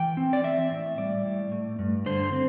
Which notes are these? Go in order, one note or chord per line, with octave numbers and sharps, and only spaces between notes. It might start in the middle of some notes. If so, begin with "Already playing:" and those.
Already playing: E3 G5
C4
D5
C4 E5
A2
G3 D5
A2
A3
G2
D3 C5
C4